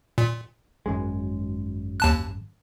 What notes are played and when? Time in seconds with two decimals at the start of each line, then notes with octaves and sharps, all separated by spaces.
0.18 A#2
0.86 G#1 F#2 G#3
2.00 D#2 A5 F#6